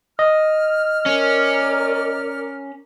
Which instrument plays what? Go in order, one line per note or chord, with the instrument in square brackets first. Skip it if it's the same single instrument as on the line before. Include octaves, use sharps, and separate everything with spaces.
[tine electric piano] D#5 [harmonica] F6
[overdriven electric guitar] C#4 [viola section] A#4 D5